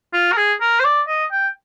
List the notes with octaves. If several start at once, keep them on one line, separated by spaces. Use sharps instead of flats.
F4
A#4
G#4
A#4
C5
D5
D#5
G5